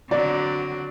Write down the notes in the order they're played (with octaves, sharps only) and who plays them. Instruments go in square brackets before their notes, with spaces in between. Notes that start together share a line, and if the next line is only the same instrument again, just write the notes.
[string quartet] D3 F#3 C4 [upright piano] D5